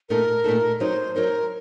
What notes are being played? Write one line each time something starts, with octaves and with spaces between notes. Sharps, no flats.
A#2 A3 D#4 A4 A#4
A#2 A3 D#4 A4
F#3 C4 D#4 C5
F#3 C4 D#4 A#4